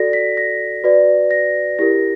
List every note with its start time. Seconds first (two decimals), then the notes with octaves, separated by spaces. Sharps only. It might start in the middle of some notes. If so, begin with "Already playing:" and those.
Already playing: F#4 A4 D5 A#6
0.13 B6
0.37 A#6
0.84 F#4 B4 D5
1.31 A#6
1.79 E4 G4 A#4 A#6